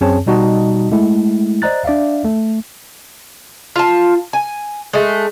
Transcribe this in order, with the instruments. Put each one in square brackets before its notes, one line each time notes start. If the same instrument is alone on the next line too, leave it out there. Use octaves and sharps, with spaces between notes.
[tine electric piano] F#2 C4 G#4 C#5 G#5 A5
B2 G3 D#4 F#4 D#5 A5
G#3 A3 E4
C5 D5 D#5 A#5 F#6 A6
D4 D5 E5 F5
A3
[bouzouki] F4 A5
G#5
G#3 A3